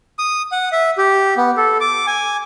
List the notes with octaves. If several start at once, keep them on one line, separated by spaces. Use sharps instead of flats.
D#6
F#5
E5
G4
B3
A4
D6
G#5